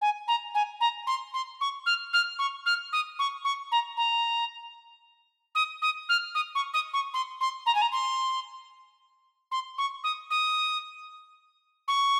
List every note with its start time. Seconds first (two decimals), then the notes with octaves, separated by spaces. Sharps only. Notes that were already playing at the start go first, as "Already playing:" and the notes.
0.01 G#5
0.28 A#5
0.54 G#5
0.80 A#5
1.07 C6
1.33 C6
1.61 C#6
1.86 F6
2.13 F6
2.38 C#6
2.66 F6
2.92 D#6
3.19 C#6
3.44 C#6
3.71 A#5
3.97 A#5
5.55 D#6
5.82 D#6
6.09 F6
6.35 D#6
6.55 C#6
6.73 D#6
6.93 C#6
7.14 C6
7.40 C6
7.66 A#5
7.75 G#5
7.81 A#5
7.92 C6
9.51 C6
9.78 C#6
10.03 D#6
10.30 D#6
11.88 C#6